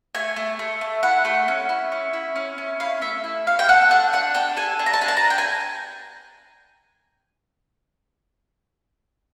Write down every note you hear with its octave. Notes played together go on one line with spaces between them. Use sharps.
A3 G#5
A3
A3
A3
E4 F#5
A3
C#4
E4
C#4
E4
C#4
C#4
E4 F5
A3 E5
E4
A3 F5
G5
A4 F#5
D4 F#5
D4 F#5
D4 G5
A4 G#5
D4
A#5
A5
D4 G#5
A5
A#5
D4
G5
G#5